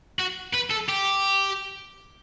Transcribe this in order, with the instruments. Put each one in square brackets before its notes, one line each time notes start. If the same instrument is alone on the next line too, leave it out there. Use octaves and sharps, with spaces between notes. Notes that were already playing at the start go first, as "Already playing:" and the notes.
[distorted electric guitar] F#4
B4
A4
G4